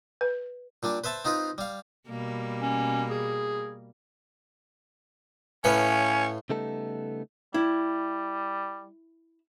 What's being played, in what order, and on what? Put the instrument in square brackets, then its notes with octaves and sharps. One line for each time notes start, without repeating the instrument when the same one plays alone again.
[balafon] B4
[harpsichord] A#2 G3 D4
B4 C5 E5 A5
C4 D#4 F4 B4
G3 F5
[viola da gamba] B2 G3 A#3
[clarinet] C#4
G#4
[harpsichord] A2 B4 F5 [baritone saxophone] C#4
[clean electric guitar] C#3 G3 A3 B3 D#4 A4
[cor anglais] G3 [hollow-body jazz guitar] E4